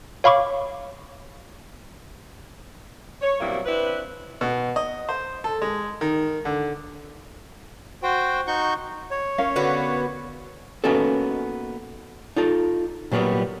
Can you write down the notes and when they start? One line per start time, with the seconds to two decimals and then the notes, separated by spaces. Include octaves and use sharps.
0.24 C#5 F5 B5 C#6 D6
3.22 C#5
3.40 B2 F#3 G3 A#3 C4 E4
3.66 C4 D4 E4 B4
4.41 B2
4.76 D#5
5.09 C5
5.44 A4
5.62 G#3
6.01 D#3
6.45 D3
8.03 F#4 C5 G5
8.47 D#4 F#4 C#6 G6
9.11 C#5
9.38 C#4 A#4 F5
9.56 D3 B3 F#4
10.84 A#3 B3 C#4 D#4 F#4 A4
12.36 D#4 F4 A4
13.12 A#2 F#3 G3 A#3 B3